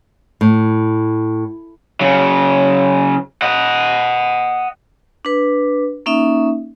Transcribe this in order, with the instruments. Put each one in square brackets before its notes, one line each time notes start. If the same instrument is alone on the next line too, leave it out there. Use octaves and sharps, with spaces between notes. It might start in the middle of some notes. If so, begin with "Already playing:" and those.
[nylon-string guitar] A2
[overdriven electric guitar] C#3 F#3
D#5 F#5
[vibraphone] D4 B4
A#3 C#4 D#4 E5